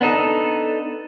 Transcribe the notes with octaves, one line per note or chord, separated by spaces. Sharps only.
B3 D4 D#4 A4